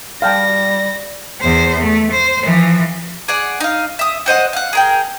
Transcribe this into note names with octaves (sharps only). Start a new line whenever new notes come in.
G3 F5 G5 A5 A#6
E2 C5
A3
C5
E3 F3
G#4 D5 F#5
D#4 F5
E5 D#6
F#4 C5 D#5 F#5
F5 F#5
G#4 A#4 G5